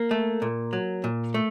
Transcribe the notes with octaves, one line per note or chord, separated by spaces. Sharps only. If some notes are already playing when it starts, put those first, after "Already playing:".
Already playing: A#3
A3
A#2
F#3
A#2
A3